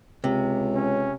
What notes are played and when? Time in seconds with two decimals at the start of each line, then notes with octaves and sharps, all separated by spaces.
0.24 C#2 C3
0.75 C#4